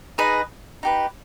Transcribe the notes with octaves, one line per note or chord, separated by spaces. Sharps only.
D#4 G#4 B4 D#5
D#4 G4 B4